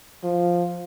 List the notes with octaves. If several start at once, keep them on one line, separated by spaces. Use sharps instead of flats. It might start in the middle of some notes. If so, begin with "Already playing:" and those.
F3